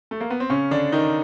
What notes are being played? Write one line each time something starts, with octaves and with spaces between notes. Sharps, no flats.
A3
A#3
B3
C4
C#3 C#4
D3 D4
D#3 D#4